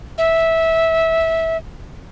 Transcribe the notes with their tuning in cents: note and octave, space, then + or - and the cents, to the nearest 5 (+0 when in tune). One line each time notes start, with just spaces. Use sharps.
E5 -15